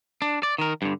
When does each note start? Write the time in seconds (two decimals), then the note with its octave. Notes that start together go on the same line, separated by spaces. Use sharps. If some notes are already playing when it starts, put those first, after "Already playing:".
0.22 D4
0.43 D5
0.58 D#3 A#4
0.82 G2 D3